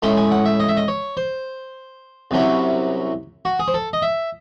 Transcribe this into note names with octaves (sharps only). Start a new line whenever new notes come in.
A2 G#3 C#4 E4 C6
G#5
F#5
E5
D#5
E5
D#5
C#5
C5
C2 C3 F#3 C#4 E4
F#4
G#4
C5
A4
D#5
E5